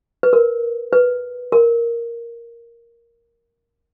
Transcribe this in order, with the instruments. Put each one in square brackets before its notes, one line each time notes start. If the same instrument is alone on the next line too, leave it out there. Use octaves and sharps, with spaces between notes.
[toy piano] B4
A#4
B4
A#4